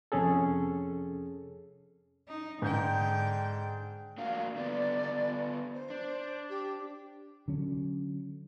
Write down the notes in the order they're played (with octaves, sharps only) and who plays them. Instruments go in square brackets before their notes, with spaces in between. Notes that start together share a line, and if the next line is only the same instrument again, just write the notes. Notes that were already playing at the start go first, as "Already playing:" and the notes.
[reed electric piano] F2 C3 C#4 G#4 A4
[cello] D#4
[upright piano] G#2 G6 [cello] D3 G5
[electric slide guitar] A#3 D4 F#4 [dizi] F5
[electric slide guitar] D3 B3 [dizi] D5
[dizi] C5
[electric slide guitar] D4
[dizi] G4
[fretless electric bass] D3 F#3 C#4